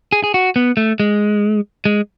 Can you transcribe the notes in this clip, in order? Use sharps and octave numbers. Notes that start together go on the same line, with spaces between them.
G#4
G#4
F#4
B3
A3
G#3
G#3